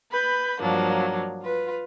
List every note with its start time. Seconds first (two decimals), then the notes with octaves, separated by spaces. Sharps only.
0.11 B4 B5 G6
0.60 G2 F3 F#3 A#3 D4
1.43 F4 B4